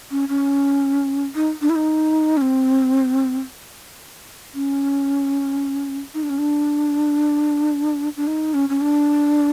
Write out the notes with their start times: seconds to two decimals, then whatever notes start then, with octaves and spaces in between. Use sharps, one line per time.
0.11 C#4
0.29 C#4
1.35 D#4
1.62 D4
1.70 E4
1.76 D#4
2.37 C#4
2.42 C4
4.55 C#4
6.14 D#4
6.23 D4
6.30 C#4
6.38 D4
8.17 D4
8.27 D#4
8.54 C#4
8.69 C#4
8.81 D4